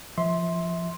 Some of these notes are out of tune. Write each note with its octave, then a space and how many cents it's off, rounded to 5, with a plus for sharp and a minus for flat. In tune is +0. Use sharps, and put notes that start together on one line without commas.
F3 -15 E5 -25 C6 +5